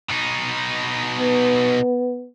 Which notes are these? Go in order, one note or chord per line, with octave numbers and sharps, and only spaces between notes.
B2 D#4
B3